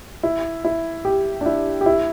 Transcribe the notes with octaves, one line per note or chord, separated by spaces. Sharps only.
E4
E4
G4
D4
E4
G4
E4